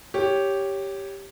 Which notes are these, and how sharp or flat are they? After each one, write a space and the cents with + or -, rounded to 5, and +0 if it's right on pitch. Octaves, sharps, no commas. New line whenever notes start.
G4 +0 C#5 +0